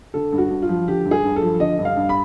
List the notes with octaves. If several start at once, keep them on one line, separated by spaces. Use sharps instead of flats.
D3 A4
G2
F#4
G2
F4
F3
D3 G4
G2
G#4
G2
A4
F3
D3 D#5
G2
F5
G2
B5